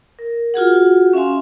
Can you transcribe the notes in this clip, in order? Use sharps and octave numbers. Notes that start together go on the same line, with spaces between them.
A#4
F4 F#4 G#4 F#5
C#4 E5 F5 G#5 C6